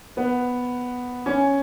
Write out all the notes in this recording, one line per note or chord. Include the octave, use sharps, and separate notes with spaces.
B3
C#4